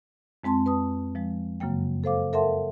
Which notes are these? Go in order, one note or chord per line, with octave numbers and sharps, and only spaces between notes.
F2 G#3 C4 A5 C6
B4 A5 D#6
F3 G#3
F#2 C#3 F#3 A#3 G5
A4 C5 F5 D6
A4 A#4 E5 F#5 A5 C6